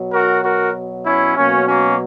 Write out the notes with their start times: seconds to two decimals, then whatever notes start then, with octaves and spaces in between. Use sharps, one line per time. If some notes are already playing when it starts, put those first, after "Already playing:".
Already playing: B2 F#3
0.12 F#4 A#4
0.43 F#4 A#4
1.05 C#4 E4
1.37 B2 F#3 A#3 C#4
1.67 A#3 C#4